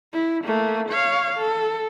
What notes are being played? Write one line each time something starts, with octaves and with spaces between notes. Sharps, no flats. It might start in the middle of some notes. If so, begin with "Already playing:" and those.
E4
A3 A#3
C#5 F5
A4